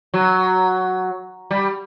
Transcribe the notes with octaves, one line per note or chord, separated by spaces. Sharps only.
F#3
G3